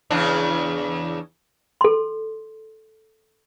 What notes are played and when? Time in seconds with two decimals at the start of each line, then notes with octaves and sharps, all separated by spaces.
0.10 E2 C#3 D4
1.81 A4 C6